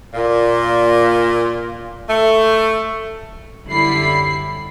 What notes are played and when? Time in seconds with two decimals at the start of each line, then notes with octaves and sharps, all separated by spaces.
0.14 A#2
2.08 A3
3.69 F#2 D3 G3 E4 B5 C7